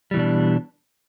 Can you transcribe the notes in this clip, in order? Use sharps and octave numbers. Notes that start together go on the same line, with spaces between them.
B2 E3 G3 D4